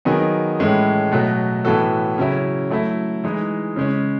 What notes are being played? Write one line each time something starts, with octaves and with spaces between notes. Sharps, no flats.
D#3 F#3 B3 D#4 G#4
A2 E3 G#3 C#4
B2 F#3 A3
A2 E3 B3 F#4 A4
C#3 F#3 C#4 E4
F#3 A3 E4
E3 G#3 D#4
C#3 G#3 C#4